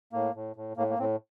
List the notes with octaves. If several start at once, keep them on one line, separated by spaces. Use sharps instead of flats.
A2 A#3
A2
A2
A2 A#3
A#3
A2 C4